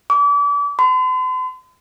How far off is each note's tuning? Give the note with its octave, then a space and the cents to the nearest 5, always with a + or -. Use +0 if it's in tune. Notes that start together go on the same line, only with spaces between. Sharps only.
D6 -35
C6 -45